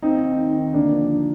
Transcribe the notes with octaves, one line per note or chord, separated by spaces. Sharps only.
D#2 C4 D#4
D#2
D#3
D#3
D2 A#3 D4
F3
D3